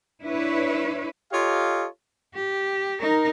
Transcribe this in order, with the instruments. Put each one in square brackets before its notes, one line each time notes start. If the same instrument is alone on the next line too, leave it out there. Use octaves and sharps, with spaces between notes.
[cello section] D4 E4 B4 C#5
[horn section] F4 G4 A4 C#5 D#5 F5
[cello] G4
D#4 A#4